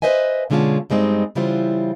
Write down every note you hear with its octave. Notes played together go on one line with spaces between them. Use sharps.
B4 C5 D#5 E5 G#5
B2 D3 G#3 C#4 F4 A5
G2 G3 G#3 C4 D#4
C#3 E3 G3 E4 F4 C5